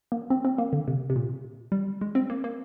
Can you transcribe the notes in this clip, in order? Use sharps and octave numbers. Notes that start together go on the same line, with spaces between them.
A#3
C4
C4
A#3
D3
C3
C3
A#2
G3
G#3
C4
A#3
A#3